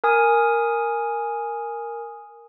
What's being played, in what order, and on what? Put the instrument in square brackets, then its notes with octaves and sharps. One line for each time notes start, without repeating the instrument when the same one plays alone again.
[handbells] A#4 G#5 D#6